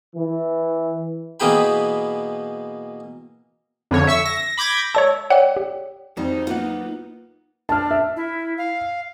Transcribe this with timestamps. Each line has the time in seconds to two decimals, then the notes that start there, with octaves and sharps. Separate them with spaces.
0.16 E3
1.40 B2 E3 A#3 G#4 G5 B5
3.91 F2 D3 C#5
4.07 E5 C#6 E6
4.25 A#6
4.58 B5 D6 G6 G#6 A#6
4.95 C#5 D5 A5 E6
5.30 C#5 D5 F#5 G5
5.57 G4
6.17 F2 G3 D#4 F#4 C5
6.47 F#3 A#3 B3 F4 F#5
7.69 D4 A5 F6
7.91 E5
8.16 E4
8.58 F5